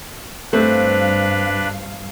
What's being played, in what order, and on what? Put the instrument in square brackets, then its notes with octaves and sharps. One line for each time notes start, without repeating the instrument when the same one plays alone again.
[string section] G2 F5 [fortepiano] A3 [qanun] C4 [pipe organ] D4 B4 B5